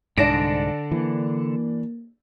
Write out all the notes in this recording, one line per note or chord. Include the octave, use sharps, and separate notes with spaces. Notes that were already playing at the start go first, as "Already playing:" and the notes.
C2 G#2 D3 D4 A5 A#6 D7
E3 A#3